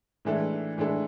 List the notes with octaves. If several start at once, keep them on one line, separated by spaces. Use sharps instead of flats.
A2 E3 G#3 D4 A4
A2 E3 G#3 D4 A4